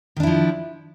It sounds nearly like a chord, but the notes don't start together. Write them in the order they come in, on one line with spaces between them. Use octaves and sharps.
D#3 D4 E4 F3